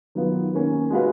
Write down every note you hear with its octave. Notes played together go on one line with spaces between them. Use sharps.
D#3 F#3 B3 F4
D#3 A#3 C#4
G#3 D#4 F#4 B4 F5